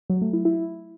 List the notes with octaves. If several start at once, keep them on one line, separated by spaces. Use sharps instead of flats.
F#3
A3
E4
E4